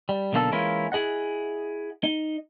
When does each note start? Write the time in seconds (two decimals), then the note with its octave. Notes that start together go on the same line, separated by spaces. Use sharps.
0.09 G3
0.33 B1 B2 D3 A#3 F#4 A4
0.52 E3 G#3 A#3 C#4 E4 F4
0.92 E4 G#4 D#5 F#5
2.04 D#4